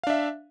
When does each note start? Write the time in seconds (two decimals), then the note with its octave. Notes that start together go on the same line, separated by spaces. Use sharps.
0.04 F5
0.07 D4
0.10 E5